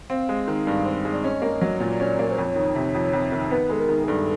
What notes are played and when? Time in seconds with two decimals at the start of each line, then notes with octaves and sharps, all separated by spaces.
0.10 C4 F5
0.29 G#3
0.48 D#3
0.67 G2
0.85 C4
1.05 G#3
1.14 D5
1.23 C#4 D#5
1.42 A#3
1.61 F#3
1.80 A#2 D5
2.00 C#4
2.19 A#3
2.31 C5
2.38 F2 C#5
2.56 D#3
2.75 C3
2.94 F2
3.13 F2
3.32 D#3
3.51 B3 B4
3.70 G#3 A4
3.80 A#4
3.89 D#3
4.04 G#4
4.08 G2 A4